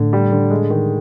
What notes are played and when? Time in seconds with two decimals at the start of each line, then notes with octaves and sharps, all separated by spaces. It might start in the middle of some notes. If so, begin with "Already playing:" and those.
Already playing: A2 D3
0.13 G3
0.32 D3
0.50 G#3
0.70 D#3